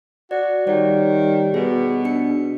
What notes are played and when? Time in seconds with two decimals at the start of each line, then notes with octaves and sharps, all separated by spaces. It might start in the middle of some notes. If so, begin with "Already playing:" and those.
0.31 F#4 D5
0.67 D#3 G3 C#5 D5
1.54 B2 G#4
2.05 D4 C#7